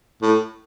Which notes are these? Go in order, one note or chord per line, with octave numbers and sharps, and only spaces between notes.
A2